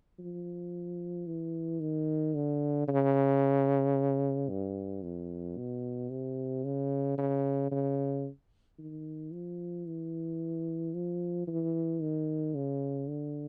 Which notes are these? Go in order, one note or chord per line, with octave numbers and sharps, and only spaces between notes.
F3
E3
D#3
D3
C#3
G2
F2
B2
C3
C#3
C#3
C#3
D#3
F3
E3
F3
E3
D#3
C#3
D3